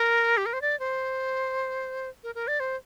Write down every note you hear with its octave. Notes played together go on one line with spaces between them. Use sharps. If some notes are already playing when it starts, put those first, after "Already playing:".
Already playing: A#4
G4
A#4
C5
D5
C5
A#4
A#4
D5
C5